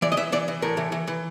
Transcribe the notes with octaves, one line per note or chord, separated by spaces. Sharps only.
E3 D5
D#5
E3 E5
E3 D5
E3
A2 A#4
E3
E3
E3